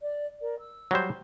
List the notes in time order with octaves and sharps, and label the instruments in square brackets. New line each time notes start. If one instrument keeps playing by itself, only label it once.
[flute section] D5
A#4 D5
E6
[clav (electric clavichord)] F#3 G3 C5